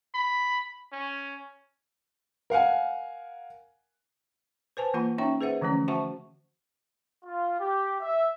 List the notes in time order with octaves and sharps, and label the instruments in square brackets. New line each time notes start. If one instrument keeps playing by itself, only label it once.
[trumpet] B5
C#4
[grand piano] A#4 F5 F#5 G#5
[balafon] B4 C5 G#5 A5
E3 A#3 F4 F#5 B5
C#4 D#4 C#5 E5 G5 C#6
G#4 B4 C5 E5 F#5
D3 E3 F3 A3 C#4 C#5
F#4 C5 E5 F#5 A5 C#6
[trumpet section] F4
G4
E5